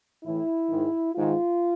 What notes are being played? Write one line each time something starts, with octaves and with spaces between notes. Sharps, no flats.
A2 E3 E4
G#2 D#3
G#2 D#3 F4